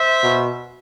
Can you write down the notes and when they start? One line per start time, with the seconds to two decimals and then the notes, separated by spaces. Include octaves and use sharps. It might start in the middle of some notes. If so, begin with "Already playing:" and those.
Already playing: C5 E5
0.24 B2